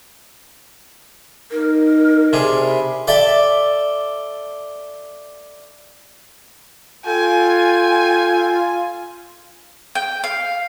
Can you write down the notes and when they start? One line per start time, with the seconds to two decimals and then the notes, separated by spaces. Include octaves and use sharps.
1.51 D#4 A#4
2.33 C3 D4 G#4 E5
2.65 B5
3.08 A4 D5 E5 G5 A5
7.06 F4 A4 G5 G#5
9.95 G5
10.24 F5